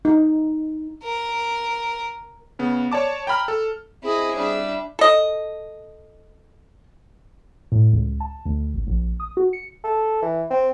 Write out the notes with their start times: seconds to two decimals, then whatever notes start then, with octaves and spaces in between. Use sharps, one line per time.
0.05 D#4
1.03 A#4
2.59 C#3 B3
2.92 C#5 D5 A5 D6
3.27 G5 A#5 B5 F6
3.48 A4
4.04 C4 E4 G#4 D#5
4.36 G3 D4 E5
4.99 A4 D#5
7.72 A2
7.93 C#2
8.20 A5
8.45 D2
8.74 G#1
8.87 A#1
9.20 D#6
9.37 F#4
9.53 C#7
9.84 A4
10.22 E3
10.50 C4